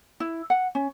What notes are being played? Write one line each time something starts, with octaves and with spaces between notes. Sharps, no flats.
E4
F#5
C#4